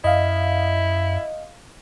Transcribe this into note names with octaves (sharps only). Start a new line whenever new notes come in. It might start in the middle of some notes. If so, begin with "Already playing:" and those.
F#2 E4 D#5 F5